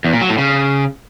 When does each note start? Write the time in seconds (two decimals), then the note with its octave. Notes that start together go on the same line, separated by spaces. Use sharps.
0.04 E2
0.13 A#2
0.21 F#3
0.30 A2
0.38 C#3